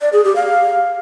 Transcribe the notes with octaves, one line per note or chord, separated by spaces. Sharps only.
D5
G#4
G4
F5